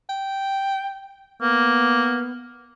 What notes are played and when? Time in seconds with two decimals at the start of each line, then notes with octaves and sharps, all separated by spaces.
0.10 G5
1.42 A#3 B3